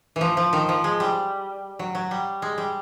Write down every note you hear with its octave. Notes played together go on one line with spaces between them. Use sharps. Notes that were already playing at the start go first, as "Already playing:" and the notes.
E3
F3
F3
D#3
F3
G#3
G3
F#3
F#3
G3
G#3
G3